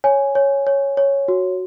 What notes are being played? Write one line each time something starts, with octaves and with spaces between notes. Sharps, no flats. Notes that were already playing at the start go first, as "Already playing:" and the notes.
C#5 G#5
C#5
C#5
C#5
F#4